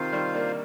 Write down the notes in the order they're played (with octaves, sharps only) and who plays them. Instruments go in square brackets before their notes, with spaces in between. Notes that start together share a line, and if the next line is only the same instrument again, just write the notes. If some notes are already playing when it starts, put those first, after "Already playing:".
Already playing: [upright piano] C3 D#3 [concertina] F4 C5 F5
[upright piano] D#3 G3
A#3 D4